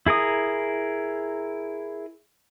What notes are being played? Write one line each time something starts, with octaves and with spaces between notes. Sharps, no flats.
E4 G#4 A#4 D#6